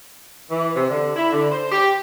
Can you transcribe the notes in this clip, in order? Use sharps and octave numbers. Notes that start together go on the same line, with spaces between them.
E3
C3
D3
E4
D3
C5
G4